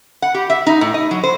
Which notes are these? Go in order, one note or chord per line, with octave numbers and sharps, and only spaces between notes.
F#5
G4
E5
D#4
A2
D#5
F#3
C5